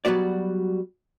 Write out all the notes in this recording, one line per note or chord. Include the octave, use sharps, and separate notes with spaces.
F#3 G3 B3 F#4 D5